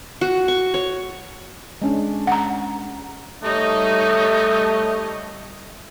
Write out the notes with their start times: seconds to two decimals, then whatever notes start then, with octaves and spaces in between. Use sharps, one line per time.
0.21 F#4
0.48 C#6
0.74 C#5
1.82 G#3 C#4 D4
2.27 F#5 A#5
3.43 G3 A3 D#4 C#5 D#5